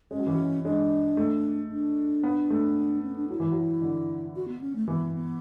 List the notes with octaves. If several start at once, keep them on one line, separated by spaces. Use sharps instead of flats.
G#3 C#4
F#3
E3
F#3
G#3 D4
A3
D4
B3
A3
C#4
D4
F#3 E4
E3
F#3
D3
F#4
B3
C#4
A3
E3 B3
B3